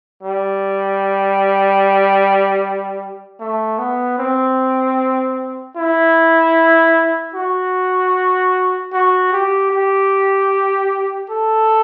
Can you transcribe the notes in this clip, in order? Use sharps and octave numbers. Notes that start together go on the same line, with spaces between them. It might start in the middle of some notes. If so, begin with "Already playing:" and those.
G3
A3
B3
C4
E4
F#4
F#4
G4
G4
A4